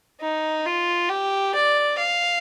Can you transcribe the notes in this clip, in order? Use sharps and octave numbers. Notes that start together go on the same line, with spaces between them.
D#4
F4
G4
D5
F5